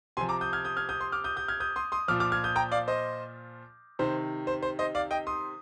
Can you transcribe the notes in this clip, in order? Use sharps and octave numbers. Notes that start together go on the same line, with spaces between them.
C3 F3 G#5 C6
A#5 D6
D#6 G6
F6 G#6
D#6 G6
F6 G#6
D#6 G6
C6 D#6
D6 F6
D#6 G6
D#6 G6
F6 G#6
D#6 G6
C6 D#6
C6 D#6
A#2 F3 D6 F6
D6 F6
F6 G#6
D#6 G6
G5 A#5
D5 F5
C5 D#5
C3 D#3 C5
C5
C5
C5 D#5
D5 F5
D#5 G5
C6 D#6